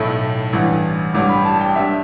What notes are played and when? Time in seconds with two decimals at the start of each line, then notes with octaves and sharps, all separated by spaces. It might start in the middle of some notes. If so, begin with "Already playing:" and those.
Already playing: B1 A2 A3 E4
0.53 A1 G2 E3
1.14 A1 G2 G3 D6
1.29 B5
1.45 A5
1.61 G5
1.76 G2 G3 D4 E5